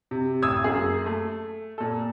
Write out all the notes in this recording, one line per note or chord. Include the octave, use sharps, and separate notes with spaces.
C3
A1 D#6 E6 G#6
F#2 A#3 G#4
A3
A#2 A4